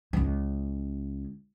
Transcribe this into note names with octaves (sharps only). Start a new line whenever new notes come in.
C#2 C#3